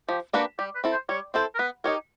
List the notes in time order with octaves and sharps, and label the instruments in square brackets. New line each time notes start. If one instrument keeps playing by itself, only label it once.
[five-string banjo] F3 [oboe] G4
[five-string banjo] A#3 D4 G4 B4 [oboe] F#4
[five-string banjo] G3 [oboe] G4
[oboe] B4
[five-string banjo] C4 E4 A4
[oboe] C5
[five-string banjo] G3 [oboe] C#5
[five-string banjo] C4 E4 A4 [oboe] C5
[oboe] A#4
[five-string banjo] B3 [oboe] B4
[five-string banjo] D#4 G4 A#4 [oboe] C#5